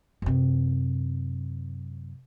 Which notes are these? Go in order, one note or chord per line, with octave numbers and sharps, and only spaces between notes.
F#2 C3